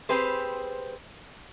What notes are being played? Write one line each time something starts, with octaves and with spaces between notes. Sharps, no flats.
C4 G4 G#4 B4 C5